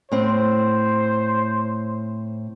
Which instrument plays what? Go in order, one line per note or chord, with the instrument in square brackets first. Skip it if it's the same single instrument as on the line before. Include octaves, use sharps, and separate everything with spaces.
[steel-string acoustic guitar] A2 C4 [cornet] C5